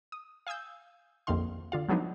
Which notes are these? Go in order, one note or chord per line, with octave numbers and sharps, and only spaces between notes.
D#6
F5 G#5 D#6 E6 G6
A#1 F2 D3 D#3 F5 C6
D3 F4 F5
F3 F#3 G#3 B3 D4 D#4